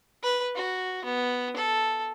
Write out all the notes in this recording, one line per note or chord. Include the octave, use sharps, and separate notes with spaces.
B4
F#4
B3
A4